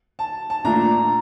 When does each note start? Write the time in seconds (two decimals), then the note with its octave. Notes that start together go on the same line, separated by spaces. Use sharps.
0.19 A5
0.50 A5
0.65 A#2 A3 D4 F4 A#5